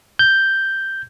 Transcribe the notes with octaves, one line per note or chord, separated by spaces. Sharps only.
G6